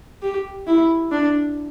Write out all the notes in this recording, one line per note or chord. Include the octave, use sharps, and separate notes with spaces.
G4
E4
D4